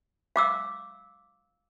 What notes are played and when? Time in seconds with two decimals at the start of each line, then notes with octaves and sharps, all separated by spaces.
0.36 F5 D6 E6